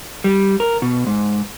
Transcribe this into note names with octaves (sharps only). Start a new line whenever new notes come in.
G3
A#4
B2
G#2